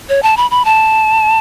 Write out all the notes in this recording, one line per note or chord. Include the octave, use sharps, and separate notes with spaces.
C#5
A5
B5
B5
A5